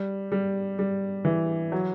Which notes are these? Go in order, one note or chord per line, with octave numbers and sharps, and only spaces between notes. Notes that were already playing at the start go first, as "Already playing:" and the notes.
Already playing: G3
G3
G3
E3
F#3